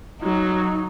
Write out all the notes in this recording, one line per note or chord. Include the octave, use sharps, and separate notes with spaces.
F#3 D#4